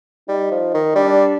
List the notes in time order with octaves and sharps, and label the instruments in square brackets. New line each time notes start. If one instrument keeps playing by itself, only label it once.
[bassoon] G3 [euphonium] D#4
[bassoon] F3
D#3
[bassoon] G3 [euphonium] D4